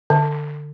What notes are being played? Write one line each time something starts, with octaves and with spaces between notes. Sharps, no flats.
D3